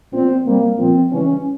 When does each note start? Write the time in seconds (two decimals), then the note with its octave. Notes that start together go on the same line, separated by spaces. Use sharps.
0.12 A#2 F3 C4
0.45 C3 G3 A#3
0.78 A#2 F3 C4
1.11 C#3 E3 G3 C#4